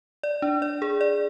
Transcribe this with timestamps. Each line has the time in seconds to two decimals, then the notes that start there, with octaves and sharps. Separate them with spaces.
0.23 D5
0.42 D4
0.62 D5
0.82 G#4
1.01 D5